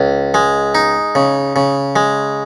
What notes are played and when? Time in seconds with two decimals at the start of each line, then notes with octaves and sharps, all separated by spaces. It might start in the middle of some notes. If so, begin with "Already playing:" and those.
Already playing: C#2
0.34 G#3
0.75 D#4
1.15 C#3
1.56 C#3
1.96 G#3